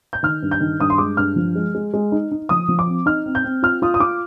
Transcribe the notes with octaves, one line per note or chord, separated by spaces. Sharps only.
G6
D#3 F6
G2
G6
D#3
G2 D#6
C6
G#3 D6
G2 F6
F3
G#3
G#3
G#3
D#4
D#4
F3 D#6
F3
D6
C4
D#4 F6
C4
G6
C4
F4 F6
F4 D#6
D#6
F4 D6